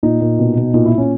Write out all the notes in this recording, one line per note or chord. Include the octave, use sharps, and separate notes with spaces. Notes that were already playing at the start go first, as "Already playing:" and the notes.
A#2 D#4
A#2
B2
B2
A#2 D#4
E4
A#2
C#4